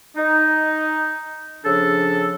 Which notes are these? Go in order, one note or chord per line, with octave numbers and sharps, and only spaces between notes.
D#4
C#3 F3 D4 A4